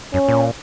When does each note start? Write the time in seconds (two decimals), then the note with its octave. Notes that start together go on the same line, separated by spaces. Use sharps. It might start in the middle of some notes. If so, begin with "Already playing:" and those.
0.14 F#2 C#4
0.28 A#2